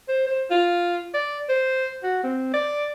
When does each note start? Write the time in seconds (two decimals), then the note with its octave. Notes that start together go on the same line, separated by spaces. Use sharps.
0.08 C5
0.27 C5
0.50 F4
1.14 D5
1.49 C5
2.03 F#4
2.23 C4
2.54 D5